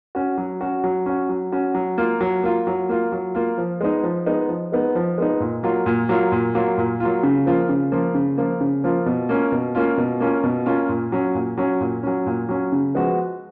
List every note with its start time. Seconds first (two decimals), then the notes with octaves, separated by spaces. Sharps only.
0.15 C#4 F#4
0.38 F#3
0.61 C#4 F#4
0.84 F#3
1.06 C#4 F#4
1.29 F#3
1.52 C#4 F#4
1.75 F#3
1.98 A#3 F4
2.21 F#3
2.43 A#3 F4
2.67 F#3
2.89 A#3 F4
3.12 F#3
3.35 A#3 F4
3.58 F3
3.81 G#3 B3 D#4
4.04 F3
4.26 G#3 B3 D#4
4.49 F3
4.72 G#3 B3 D#4
4.95 F3
5.18 G#3 B3 D#4
5.40 A#2
5.63 F#3 A#3 F4
5.86 A#2
6.09 F#3 A#3 F4
6.32 A#2
6.55 F#3 A#3 F4
6.78 A#2
7.00 F#3 A#3 F4
7.23 C#3
7.46 F3 A#3 F4
7.69 C#3
7.92 F3 A#3 F4
8.15 C#3
8.38 F3 A#3 F4
8.61 C#3
8.84 F3 A#3 F4
9.06 B2
9.29 A#3 C#4 F4
9.52 B2
9.75 A#3 C#4 F4
9.98 B2
10.20 A#3 C#4 F4
10.44 B2
10.66 A#3 C#4 F4
10.89 A#2
11.12 F#3 C#4
11.35 A#2
11.58 F#3 C#4
11.81 A#2
12.03 F#3 C#4
12.26 A#2
12.49 F#3 C#4
12.72 C#3
12.95 F3 G#3 B3 F#4